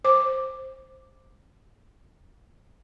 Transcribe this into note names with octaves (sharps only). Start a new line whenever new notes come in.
C5 D6